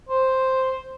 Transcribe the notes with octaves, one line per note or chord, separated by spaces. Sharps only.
C5